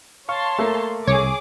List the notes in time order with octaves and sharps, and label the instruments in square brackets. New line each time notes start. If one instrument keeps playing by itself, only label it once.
[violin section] C#5 A5 C6 [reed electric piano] F5 C#6
[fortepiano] A3 A#3
[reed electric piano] C2 [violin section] G#4 D6 [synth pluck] C#5